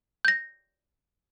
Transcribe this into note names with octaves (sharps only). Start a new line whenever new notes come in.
G6 A#6